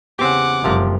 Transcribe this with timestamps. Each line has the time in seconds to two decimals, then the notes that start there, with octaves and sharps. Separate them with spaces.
0.19 E2 C#3 C4 G4 F#5 D6
0.64 F#1 D2 C3 F3 G3 A#4